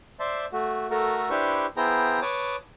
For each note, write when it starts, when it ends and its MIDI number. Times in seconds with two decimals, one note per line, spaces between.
0.20 0.46 72
0.20 0.46 74
0.20 0.46 76
0.20 0.46 81
0.20 0.46 84
0.52 0.88 57
0.52 0.88 66
0.90 1.29 57
0.90 1.29 66
0.90 1.29 69
0.90 1.29 70
1.30 1.66 62
1.30 1.66 64
1.30 1.66 67
1.30 1.66 71
1.30 1.66 72
1.30 1.66 85
1.77 2.20 59
1.77 2.20 64
1.77 2.20 68
1.77 2.20 72
1.77 2.20 79
1.77 2.20 82
2.22 2.56 71
2.22 2.56 73
2.22 2.56 81
2.22 2.56 86
2.22 2.56 87